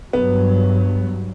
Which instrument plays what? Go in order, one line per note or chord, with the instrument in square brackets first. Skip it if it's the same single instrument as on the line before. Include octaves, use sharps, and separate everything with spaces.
[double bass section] G2 F#3 [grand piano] B3